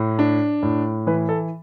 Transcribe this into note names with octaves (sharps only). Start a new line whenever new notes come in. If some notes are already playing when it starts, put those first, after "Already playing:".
Already playing: A2
D4
A2
E3 B4
A4